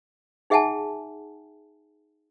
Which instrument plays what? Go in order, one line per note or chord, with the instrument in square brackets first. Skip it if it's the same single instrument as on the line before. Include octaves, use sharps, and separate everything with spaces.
[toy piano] D#4 G#4 E5 F#5 G#5 A5